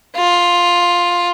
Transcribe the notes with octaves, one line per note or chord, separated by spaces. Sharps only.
F4